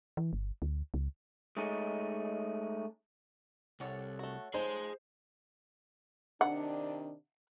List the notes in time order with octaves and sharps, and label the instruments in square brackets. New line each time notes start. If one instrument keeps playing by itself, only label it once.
[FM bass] E3
G1
D2
C#2
[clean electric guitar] G#3 A3 C#4 D#4
[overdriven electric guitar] C2 [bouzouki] A4 C#5 F#5
[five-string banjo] A3 F#4
[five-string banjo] F3 G#3 D#4 [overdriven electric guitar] G#4 C6 [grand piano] C5
[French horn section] C3 D#3 D4 [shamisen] F#5